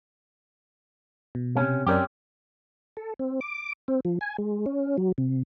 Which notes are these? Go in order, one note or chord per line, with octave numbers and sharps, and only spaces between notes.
B2
C3 C#4
F#2 C4 C#4 G4 A#4 D5
A4
C4
D6
C4
F3
G#5
G#3
C#4
F#3
C3